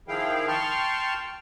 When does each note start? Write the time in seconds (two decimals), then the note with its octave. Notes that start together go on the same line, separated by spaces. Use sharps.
0.08 D#3 F3 E4 G#4 F5 G5
0.48 G5 A5 C6 C#6 F6